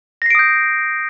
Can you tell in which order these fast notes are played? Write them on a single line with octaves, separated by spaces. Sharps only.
A#6 C7 D7 D#6 G6